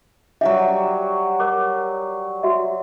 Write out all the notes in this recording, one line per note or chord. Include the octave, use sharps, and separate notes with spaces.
F#3 G3 G4 E5
A#4 C#5 D6
F#4 E5